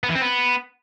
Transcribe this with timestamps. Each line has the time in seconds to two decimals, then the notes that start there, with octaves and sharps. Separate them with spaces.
0.03 B3
0.09 E3
0.15 C4
0.21 B3